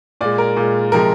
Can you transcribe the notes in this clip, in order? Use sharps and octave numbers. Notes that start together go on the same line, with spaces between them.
A#2 G#3 D5
A#4
A#2 G#3
C3 F3 G#3 A#4